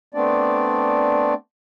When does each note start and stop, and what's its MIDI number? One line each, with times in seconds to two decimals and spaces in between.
0.14 1.34 57
0.14 1.34 59
0.14 1.34 60
0.14 1.34 62
0.14 1.34 74